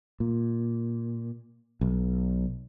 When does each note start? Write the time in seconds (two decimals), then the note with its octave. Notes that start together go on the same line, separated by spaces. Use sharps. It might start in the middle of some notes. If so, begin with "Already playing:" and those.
0.20 A#2
1.81 B1